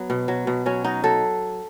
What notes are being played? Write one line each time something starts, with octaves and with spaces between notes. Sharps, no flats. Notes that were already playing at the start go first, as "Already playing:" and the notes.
Already playing: F#3 B3
B2
F#3
B2
F#3 C#4
F#3 D#4
F#3 A4